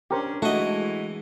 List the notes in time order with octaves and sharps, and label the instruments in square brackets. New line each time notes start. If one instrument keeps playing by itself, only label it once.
[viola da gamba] C#4 D4 [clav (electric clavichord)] G4 A#4 C5
[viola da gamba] E3 G#3 [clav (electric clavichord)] A3 [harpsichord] F#4 D#5